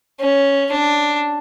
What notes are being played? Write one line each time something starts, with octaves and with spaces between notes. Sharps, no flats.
C#4
D4